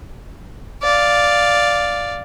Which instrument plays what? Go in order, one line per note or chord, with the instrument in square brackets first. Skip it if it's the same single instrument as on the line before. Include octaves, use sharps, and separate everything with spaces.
[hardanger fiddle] D5 F5